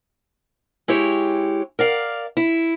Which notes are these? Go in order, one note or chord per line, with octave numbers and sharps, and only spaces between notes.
G#3 E4 G4 C#5
A#4 D5 F5
E4